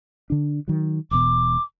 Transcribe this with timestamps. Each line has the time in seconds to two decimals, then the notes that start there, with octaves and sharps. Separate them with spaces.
0.30 D3 D4
0.68 D#3 F#3
1.11 E1 E2 B2 D6